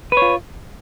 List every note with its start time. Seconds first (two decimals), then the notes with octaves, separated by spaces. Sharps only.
0.12 B4
0.17 C#5
0.22 F4